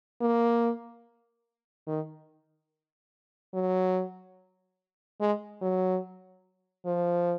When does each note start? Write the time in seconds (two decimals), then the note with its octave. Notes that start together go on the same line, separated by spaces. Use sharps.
0.21 A#3
1.88 D#3
3.54 F#3
5.20 G#3
5.61 F#3
6.86 F3